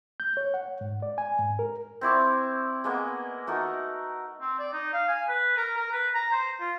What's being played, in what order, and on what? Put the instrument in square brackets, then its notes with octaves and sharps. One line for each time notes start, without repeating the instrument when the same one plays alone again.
[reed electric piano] G6
C#5
F#5
G#2
D5
G#5
G#2
A#4
[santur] C4 E4 D5 C#6
G#3 A#3 B3
A3 D#4 F#4 A#4
[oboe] C4
D5
D#4
F5
G#5
B4
A#4
A#4
B4
A#5
C5
F4